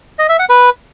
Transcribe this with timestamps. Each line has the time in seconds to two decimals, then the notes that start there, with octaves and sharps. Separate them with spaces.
0.19 D#5
0.29 E5
0.39 F#5
0.49 B4